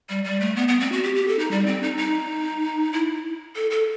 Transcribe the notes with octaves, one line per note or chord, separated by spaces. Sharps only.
G3
G3
A3
B3
B3
C4
F#4
G4
G4
A4
D#4
G3
C4
D#4
D#4
E4
A4
A4